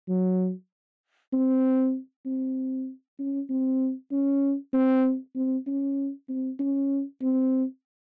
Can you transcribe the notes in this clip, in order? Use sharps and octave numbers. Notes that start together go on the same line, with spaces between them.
F#3
C4
C4
C#4
C4
C#4
C4
C4
C#4
C4
C#4
C4